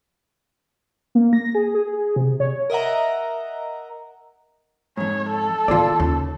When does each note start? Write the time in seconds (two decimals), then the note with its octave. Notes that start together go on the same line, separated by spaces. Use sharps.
1.15 A#3
1.33 A#6
1.55 G#4
1.75 G#4
2.16 C3
2.40 C#5
2.70 A#4 D#5 E5 F#5 A#5
4.97 F2 G#2 C#5
5.28 A4
5.68 D#3 B3 F4 G#4 D5
6.00 D#2 C#3